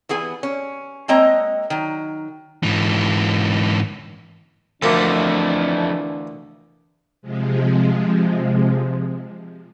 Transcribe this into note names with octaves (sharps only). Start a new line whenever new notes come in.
E3 B3 G#4 G#5
C#4
G#3 A#3 C4 C#5 D#5 A#5
D#3 F#3
G#2 E3
D2 E3 F3 A3 A#3 D4
C3 F3 G#3